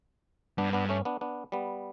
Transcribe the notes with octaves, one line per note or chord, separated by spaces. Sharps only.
G2 B3 D4
B3 D4
A3 C#4
B3 D4
B3 D4
G3 B3